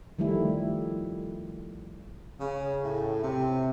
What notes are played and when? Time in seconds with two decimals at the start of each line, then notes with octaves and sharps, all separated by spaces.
0.19 D#3 F3 G3 A3 E4
2.39 C#3
2.83 A2
3.23 C3